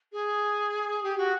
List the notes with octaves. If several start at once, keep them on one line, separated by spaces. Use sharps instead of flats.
G#4
G4
F#4